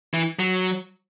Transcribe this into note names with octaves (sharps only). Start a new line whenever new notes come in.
E3
F#3